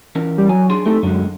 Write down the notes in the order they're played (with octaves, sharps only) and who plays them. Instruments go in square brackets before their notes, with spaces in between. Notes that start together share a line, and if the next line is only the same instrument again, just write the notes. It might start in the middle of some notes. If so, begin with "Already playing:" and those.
[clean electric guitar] E3 C#4 A#4
[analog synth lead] G3
[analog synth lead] F#3 [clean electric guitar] G#5
[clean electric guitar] D4 G#4 C6
[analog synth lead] A3 [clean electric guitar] C4 D#4 G4
[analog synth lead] F#2 [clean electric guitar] D3 G#3